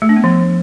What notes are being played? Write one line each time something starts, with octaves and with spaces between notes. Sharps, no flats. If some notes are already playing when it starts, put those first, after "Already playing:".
A3
D4
B3
F3